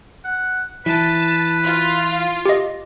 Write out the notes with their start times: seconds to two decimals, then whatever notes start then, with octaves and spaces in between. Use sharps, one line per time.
0.25 F#5
0.86 E3 B4 A5
1.63 F4
2.45 G4 D#5